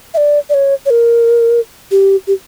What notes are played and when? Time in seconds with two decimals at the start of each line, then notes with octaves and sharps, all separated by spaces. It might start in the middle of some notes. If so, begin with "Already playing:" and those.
0.14 E5
0.17 D5
0.50 D5
0.54 C#5
0.86 C#5
0.90 A#4
1.91 G4
2.27 G4